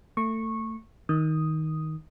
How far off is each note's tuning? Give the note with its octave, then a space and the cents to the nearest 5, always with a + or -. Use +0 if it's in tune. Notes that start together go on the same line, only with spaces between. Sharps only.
A3 +25 C#6 -15
D#3 +10 D#6 +0